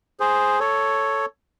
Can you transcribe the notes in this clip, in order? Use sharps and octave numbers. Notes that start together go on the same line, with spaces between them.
G#4 C5
A4 C#5